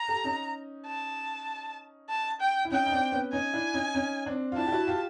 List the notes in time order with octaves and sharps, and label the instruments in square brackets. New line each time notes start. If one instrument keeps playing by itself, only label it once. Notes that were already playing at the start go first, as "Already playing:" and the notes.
Already playing: [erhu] A#5
[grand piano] G4 A4
C#4 D#4
[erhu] A5
A5
G5
[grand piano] E4
[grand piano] C#4 D#4 [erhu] G5
[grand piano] D#4
C4 D4
B3 C#4
[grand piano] C#4 D#4 [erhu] G#5
[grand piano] D4 E4
C#4 D#4
C#4 D#4
C4 D4
F4
[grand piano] D4 E4 [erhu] A5
[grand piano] G4
E4 F#4
F4 G4